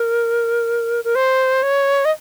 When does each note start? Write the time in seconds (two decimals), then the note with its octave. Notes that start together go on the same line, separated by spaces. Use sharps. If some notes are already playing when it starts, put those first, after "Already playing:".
Already playing: A#4
1.04 A#4
1.15 C5
1.63 C#5
2.05 D#5